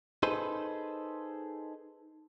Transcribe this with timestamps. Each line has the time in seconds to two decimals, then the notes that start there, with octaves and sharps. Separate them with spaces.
0.23 D#4 G#4 A4 B4 C5